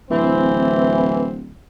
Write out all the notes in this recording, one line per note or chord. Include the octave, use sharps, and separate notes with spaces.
D1 E3 C4